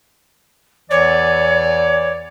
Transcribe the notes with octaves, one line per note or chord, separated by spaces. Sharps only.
E2 E3 C#5 D5